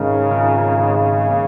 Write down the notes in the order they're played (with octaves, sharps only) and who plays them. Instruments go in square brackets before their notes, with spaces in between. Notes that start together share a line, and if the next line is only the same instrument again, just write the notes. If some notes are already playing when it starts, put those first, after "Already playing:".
Already playing: [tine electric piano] G#1 G#2 G#3 D#4 A#4 [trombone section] C#3
[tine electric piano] G#1 G#2 G#3 F4 A#4
G#1 G#2 G#3
D#3 A#3